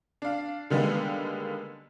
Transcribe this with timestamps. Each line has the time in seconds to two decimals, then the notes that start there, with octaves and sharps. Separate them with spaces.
0.22 D4 F5
0.70 D3 D#3 G3 G#3 A#3 B3